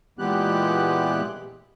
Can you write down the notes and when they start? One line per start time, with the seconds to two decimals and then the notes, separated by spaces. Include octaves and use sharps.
0.19 A#2 E3 G#3 B3 G4 F#6